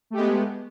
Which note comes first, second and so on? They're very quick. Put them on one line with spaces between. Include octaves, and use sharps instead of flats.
A3 G4 G#3 B3